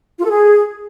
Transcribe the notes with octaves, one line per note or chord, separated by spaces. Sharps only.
F4
A4
G#4